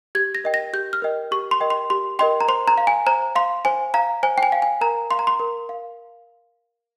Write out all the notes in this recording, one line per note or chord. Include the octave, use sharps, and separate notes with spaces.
G4 G#6
A#6
A#4 D#5 G5
A#6
G4 G6
F6
A#4 D#5 G5
G4 C#6
C6
A#4 D#5 G5
C6
G4 C6
A#4 D#5 G5 C6
A#5
C5 C6
A#5
F5
G#5
C5 A#5
F5 C6
C5 G#5
F5 A#5
C5 G#5
G5
G#5
F5
G#5
A#4 A#5
F5 C6
A#5
C6
A#4
F5